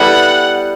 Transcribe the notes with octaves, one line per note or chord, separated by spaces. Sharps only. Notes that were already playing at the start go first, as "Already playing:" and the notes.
Already playing: G3 B3 E4 A4 F#5